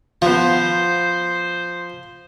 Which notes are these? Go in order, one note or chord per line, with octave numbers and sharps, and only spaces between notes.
F3 B3 F4 C5